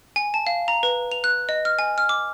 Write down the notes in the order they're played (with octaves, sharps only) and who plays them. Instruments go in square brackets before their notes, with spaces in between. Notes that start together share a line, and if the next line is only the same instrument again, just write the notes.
[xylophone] G#5
A5
F5
A#5
B4
F7
F#6
D#5
F6
G#5
F6
D6